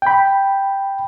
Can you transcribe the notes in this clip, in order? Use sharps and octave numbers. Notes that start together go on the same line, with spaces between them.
G5 B5